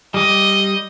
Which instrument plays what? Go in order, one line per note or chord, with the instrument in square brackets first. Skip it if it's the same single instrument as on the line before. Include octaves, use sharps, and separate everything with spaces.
[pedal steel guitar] G3 D6 [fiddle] D#5